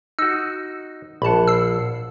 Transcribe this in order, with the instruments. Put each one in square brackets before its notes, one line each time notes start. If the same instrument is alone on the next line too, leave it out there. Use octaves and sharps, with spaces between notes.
[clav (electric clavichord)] D#4 F#4 [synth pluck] E6
[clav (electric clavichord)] A#1 F#5 [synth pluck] A5 B5
[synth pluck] E6 C7